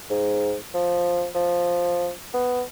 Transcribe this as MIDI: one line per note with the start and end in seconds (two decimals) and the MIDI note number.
0.10 0.55 44
0.74 1.27 53
1.35 2.11 53
2.34 2.62 59